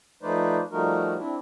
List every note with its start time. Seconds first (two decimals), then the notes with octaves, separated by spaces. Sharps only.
0.22 F3 A3 D#4 B4 C5 D5
0.72 F3 G3 A3 D#4 F#4 A#4
1.18 C4 D4 E4